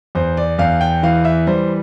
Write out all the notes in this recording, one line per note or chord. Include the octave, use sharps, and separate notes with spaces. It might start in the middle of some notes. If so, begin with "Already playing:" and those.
E2 C5
D5
E2 F5
G5
E3 F5
E5
G3 C5